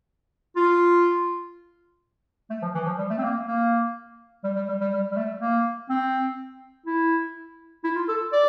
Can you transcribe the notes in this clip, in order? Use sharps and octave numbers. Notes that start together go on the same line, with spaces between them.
F4
A3
F3
E3
F3
G3
A3
C4
A#3
A#3
G3
G3
G3
G3
G3
G3
A3
A#3
C4
E4
E4
F4
A4
D5